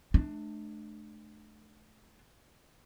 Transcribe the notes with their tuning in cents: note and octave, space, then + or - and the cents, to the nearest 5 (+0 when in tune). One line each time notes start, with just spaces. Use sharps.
A3 -35 D4 +30